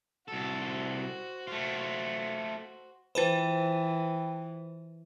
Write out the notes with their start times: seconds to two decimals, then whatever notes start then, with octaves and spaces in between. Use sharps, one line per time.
0.28 C2 F#4 A4 C5
1.47 A3 F4
3.15 E3 F4 B4 C5 G5 A5 B5